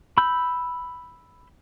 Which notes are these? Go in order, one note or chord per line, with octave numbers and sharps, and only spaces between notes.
B5 E6 G6